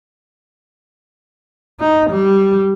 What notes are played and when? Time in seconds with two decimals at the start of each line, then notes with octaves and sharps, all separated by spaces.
1.80 D#4
2.10 G3